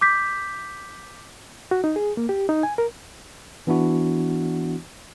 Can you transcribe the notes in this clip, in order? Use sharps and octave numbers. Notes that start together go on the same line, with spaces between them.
D6 G6 B6
F#4
D#4
G#4
A#3
G4
D#4
G#5
A#4
E3 B3 D4 E4 F#4